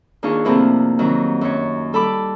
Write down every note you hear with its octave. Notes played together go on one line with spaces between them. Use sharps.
D#2 D4 F4 G#4 F5 C#6
A2 C3 F3 A#3 D4 E4
F2 D#3 F#3
F#2 C#5
G3 A4 B5 D6